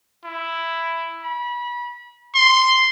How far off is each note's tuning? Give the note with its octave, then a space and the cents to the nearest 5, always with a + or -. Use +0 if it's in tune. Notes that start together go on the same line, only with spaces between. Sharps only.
E4 +5
B5 -30
C6 -5